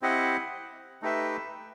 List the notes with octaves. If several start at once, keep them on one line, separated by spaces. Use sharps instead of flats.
C4 E4 G4 D#5 F#5
A3 D#4 G4 B4 E5